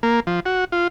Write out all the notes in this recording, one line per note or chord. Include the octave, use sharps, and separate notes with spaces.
A#3
F3
F#4
F4